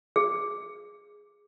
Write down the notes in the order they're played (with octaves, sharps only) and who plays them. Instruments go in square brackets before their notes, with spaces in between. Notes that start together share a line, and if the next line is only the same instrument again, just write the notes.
[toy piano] G#4